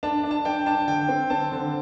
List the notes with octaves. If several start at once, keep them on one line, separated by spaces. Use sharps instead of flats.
D4 A5
D4
A5
D4 G5
D4 A5
D3 G5
C4
C4 A5
D3